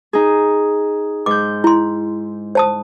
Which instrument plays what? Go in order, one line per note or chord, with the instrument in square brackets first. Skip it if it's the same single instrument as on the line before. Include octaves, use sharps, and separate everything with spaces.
[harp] D#4 G#4
[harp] G#2 G6 [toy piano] D6
[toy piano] E4 C6
C5 A5 D#6